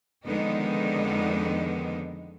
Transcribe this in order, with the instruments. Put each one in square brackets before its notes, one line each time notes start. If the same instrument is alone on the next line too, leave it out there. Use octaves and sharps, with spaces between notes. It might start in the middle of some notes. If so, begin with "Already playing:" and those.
[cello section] F2 D3 D#3 G#3 B3 D#4